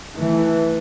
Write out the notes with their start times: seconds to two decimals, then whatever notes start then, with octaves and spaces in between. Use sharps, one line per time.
0.14 E3 A3